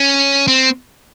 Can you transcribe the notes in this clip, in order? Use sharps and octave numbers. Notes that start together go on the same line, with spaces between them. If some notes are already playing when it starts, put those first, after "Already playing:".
Already playing: C#4
C4